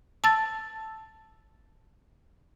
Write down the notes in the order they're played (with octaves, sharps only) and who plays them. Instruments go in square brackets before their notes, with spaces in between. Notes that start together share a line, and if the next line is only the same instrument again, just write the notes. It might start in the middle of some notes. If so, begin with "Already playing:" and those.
[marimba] A5 E6 A6